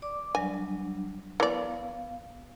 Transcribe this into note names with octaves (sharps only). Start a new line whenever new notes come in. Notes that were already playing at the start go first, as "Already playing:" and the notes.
D5 D6
F#3 G3 D4 G#5
E3 B3 D5 F5